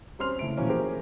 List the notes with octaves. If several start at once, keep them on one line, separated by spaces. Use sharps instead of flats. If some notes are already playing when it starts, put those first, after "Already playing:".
G3 C4 C#4 C6 F6 F7
C#2 A3 E4 D7
B2 E3 F3 A#3 C#4
G4 G#4 A#4 C5 G#5